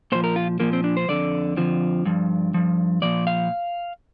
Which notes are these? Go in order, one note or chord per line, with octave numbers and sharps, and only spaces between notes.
A#2 F3 C5
A#4
F4
A#2 F3 A#3
C4
D4
C5
F2 D3 F3 D5
F2 D3 F3
G2 F3
G2 F3
A#2 F3 D5
F5